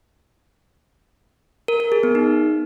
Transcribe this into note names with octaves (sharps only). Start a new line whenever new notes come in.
A#4
A#4
G#4
B3
D#4